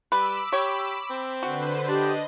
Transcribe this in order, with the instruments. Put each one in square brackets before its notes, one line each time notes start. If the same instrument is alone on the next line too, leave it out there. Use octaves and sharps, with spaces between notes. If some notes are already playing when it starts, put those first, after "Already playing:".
[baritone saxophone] G3 [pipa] B4 [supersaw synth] B5 D6 E6
[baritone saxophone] G4 [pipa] C#5
[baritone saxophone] C4
[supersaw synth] D3 B4 C5 [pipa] F#4
[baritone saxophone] D4 [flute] G4 [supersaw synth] D#5